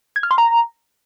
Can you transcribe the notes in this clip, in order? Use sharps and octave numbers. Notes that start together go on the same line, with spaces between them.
G#6
F6
C6
A#5